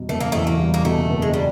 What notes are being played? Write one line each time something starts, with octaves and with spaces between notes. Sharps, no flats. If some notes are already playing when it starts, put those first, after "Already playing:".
Already playing: E2 B2 G3
F#1 A3
A#3
E2 A3
A#3
G3
A#3
B2 A3
F#1
G#3
G3